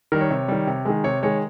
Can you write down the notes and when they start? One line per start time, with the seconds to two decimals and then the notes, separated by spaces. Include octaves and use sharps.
0.12 D#3 A#4
0.14 G3
0.21 C#5
0.30 C3
0.48 D#3 G3
0.67 C3
0.85 D#3 G#3
1.04 C3 C#5
1.23 D#3 G#3 C#5